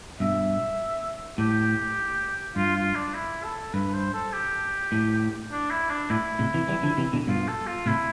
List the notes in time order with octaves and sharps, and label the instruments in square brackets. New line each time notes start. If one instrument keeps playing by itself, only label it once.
[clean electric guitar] G2 B2 [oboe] E5
[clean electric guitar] A2 [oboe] G4
[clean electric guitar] G2 [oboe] F4
[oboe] F4
D4
E4
A4
[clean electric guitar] G2 [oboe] B4
[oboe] C5
A4
G4
[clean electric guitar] A2
[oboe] D4
E4
D4
[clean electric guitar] A2 [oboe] E4
[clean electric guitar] A2 C3
C3 E3
E3 G3
D3 F3
C3 E3
B2 D3
[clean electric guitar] G2 B2 [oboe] F4
[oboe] A4
F4
[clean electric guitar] A2 C3 [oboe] E4